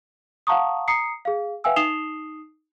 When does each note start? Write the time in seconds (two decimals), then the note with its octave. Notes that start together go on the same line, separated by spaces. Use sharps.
0.47 F5 F#5 A5 A#5 C#6 D#6
0.88 A#5 D#6 C7 C#7
1.25 G#4 F5
1.64 B4 E5 F5 G5 G#5 E6
1.76 D#4 D#6 C7 E7 F7 G7